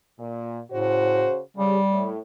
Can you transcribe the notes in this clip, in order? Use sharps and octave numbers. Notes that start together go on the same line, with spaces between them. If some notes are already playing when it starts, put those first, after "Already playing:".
A#2
A2 C#3 F#4 C5
C#3 G3 G4
A2